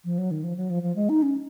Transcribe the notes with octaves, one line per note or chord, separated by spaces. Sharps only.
F3
F#3
D#3
F3
F#3
F3
F3
G#3
D#4
C#4